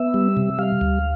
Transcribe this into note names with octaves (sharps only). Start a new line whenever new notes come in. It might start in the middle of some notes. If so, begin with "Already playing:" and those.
Already playing: B3 E5
G3
C3
G3 F5
D2